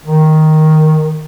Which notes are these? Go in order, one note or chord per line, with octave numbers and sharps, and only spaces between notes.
D#3